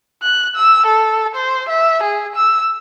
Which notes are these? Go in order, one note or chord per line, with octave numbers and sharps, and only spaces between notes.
F#6
E6
A4
C5
E5
G#4
E6